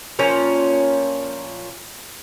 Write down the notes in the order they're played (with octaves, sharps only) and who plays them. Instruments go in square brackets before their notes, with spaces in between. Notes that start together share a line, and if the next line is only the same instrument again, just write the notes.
[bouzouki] A#2 F3 C#4